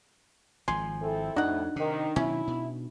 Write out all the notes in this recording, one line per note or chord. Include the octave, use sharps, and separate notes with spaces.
G#1 F3 G#5 C6
C4 E4 A4
F2 A2 D4 D#4 F#4 F#5
C3 D#3
B2 D#3 F#3 C#4 E4
B2